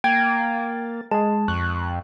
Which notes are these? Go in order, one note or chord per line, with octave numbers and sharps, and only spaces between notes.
A#3 G5 G#6 A6
G#3 G#4 A5
F2 C#6 F#6